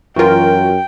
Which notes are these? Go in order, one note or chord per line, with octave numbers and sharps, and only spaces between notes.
F#2 E3 F4 F#4 A#4 G5